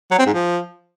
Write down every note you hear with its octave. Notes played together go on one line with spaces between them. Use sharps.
F#3
C4
G#2
F3